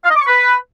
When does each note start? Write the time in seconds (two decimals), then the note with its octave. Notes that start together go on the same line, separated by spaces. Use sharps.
0.05 F5
0.10 D#5
0.16 D6
0.21 C#6
0.27 B4